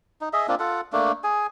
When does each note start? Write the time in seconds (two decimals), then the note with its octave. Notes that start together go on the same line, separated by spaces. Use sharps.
0.21 D#4
0.33 G#4 D#5 E5
0.48 A#3 C4 D4 F4
0.59 F4 A4 F#5
0.93 A3 A#3 D4
1.24 G#4 G#5